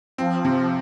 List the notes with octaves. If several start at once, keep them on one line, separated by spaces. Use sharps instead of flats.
F3 C4
C3